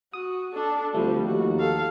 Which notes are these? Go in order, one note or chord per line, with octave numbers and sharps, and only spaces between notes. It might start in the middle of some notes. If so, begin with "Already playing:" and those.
F#4 D#6
D4 A4
D2 F3 G3 A3 C4
D#2 F#4
A4 F5